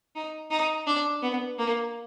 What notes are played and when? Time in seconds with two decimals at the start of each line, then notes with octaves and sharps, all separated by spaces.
0.15 D#4
0.51 D#4
0.87 D4
1.22 B3
1.58 A#3